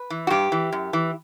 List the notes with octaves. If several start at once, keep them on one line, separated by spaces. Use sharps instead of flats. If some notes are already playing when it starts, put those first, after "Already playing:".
Already playing: B4
E3
F#4
G2 G4
E3
F#2
E3